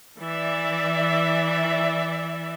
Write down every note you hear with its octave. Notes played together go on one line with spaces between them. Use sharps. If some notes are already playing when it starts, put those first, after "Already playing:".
E3 D5 E5